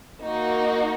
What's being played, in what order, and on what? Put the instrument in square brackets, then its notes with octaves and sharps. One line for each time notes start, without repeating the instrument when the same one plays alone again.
[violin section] A#3 D#4 F#4